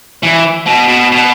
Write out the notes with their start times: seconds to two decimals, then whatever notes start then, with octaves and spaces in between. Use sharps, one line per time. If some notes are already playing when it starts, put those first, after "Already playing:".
0.23 E3
0.66 B2
0.88 B2
1.12 B2